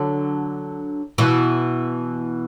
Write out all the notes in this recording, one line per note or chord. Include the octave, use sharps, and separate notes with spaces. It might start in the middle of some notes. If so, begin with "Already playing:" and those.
Already playing: D3 F#3
B2 E3